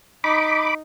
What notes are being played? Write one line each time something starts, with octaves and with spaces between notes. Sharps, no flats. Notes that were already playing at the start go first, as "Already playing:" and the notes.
D#4 B5 D6